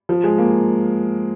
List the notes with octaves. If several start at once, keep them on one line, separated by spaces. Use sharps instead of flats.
F3
G#3
A#3